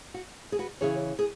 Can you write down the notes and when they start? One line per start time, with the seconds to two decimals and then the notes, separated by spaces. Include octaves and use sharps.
0.14 F#4
0.52 G#4
0.59 F#4 B4
0.81 C#3 E3 C#4 G#4 C#5
1.19 G#4